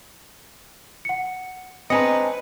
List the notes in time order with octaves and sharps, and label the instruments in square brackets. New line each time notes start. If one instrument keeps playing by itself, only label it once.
[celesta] F#5 C#7
[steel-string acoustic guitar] C4 D4 [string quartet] B4 [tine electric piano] D#5 G#5 A#5 [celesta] C#7